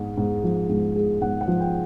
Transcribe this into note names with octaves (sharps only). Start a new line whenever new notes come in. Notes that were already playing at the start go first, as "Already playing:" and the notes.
Already playing: G#2 G#3
G#2
F3
G#2
G#3
G#2 F#5
F#5
F3
G5